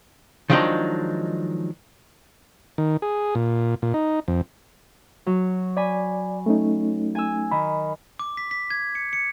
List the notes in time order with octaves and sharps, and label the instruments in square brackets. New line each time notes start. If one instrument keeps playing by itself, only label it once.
[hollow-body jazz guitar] D#3 F3 F#3 G#3 D4 D#4
[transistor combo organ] D#3
G#4
A#2
A#2
D#4
F2
[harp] F#3
[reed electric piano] D5 [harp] G#5 B5
[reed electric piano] A3 C#4 D#4
[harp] G#5 E6
[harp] D#3 [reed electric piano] B5
[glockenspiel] D6
B6
B6
G#6
C#7
C#7